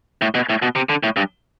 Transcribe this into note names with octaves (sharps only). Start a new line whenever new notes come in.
A2
B2
A2
B2
C3
D3
A2
G2